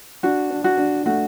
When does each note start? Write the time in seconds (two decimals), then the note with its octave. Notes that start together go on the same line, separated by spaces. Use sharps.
0.23 D4 F#4
0.50 D4
0.64 F#4
0.77 D4
1.06 A3 F#4